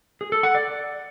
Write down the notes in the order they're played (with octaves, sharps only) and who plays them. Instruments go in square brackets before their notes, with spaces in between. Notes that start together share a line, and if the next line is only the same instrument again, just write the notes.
[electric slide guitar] G#4
A4
F#5
D5